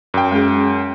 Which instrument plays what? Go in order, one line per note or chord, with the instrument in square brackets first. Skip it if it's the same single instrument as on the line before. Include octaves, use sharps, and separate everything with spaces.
[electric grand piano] F#2 G5
[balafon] G#3 C#4 G#4